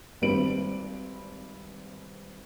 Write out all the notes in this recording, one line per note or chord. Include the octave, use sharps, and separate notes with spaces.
G#1 G3 C4 B4 D7 F#7